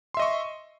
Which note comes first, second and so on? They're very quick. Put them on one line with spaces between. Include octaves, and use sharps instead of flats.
C6 E5 D#5 C#6